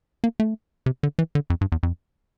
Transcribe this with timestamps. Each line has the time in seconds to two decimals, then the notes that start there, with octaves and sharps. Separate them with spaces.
0.24 A#3
0.40 A3
0.86 C3
1.03 D3
1.19 E3
1.35 D3
1.50 F2
1.61 G2
1.72 E2
1.83 F2